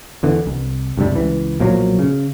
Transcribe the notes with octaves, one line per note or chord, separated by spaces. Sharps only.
E2 D3 E3
C2
C#2 G2 C3 G3
C#2 E3
B1 A#2 F3 F#3
C#3